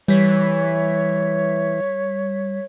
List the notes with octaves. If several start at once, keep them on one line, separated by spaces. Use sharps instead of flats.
E3 G3 C#5 B6